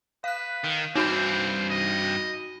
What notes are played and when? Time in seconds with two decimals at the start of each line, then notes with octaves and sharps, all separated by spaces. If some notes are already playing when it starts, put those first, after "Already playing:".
0.24 B4 F5 F#6
0.64 D#3
0.96 G2 C4 D#4 F#4 C5 B5
1.70 D#5